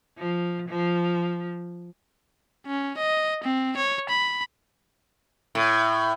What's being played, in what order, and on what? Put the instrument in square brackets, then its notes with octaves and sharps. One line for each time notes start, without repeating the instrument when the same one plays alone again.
[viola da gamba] F3
F3
[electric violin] C#4
D#5
C4
C#5
B5
[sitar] A2